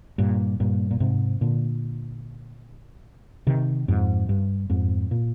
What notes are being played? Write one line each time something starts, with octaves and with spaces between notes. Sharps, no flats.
G2 A#2
G2 A#2
A#2
G#2 C3
A#2 D3
C3 D#3
F2 G#2
G2
F2 G#2
A#2